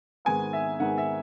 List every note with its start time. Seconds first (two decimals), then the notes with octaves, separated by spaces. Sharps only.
0.25 G#2 D#3 G#3 B3 G#5
0.53 E5
0.79 G#2 D#3 G#3 B3 F#5
0.98 E5